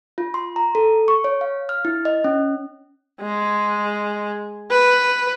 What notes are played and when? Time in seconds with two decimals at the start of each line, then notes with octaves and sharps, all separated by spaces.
0.18 F4
0.34 C6
0.56 A#5
0.75 A4
1.08 C#6
1.24 C#5
1.41 F5
1.69 F6
1.85 E4
2.05 D#5
2.24 C#4
3.21 G#3
4.71 B4